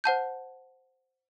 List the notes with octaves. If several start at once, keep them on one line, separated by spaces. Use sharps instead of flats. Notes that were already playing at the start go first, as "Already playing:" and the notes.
C5 F#5 A5 G6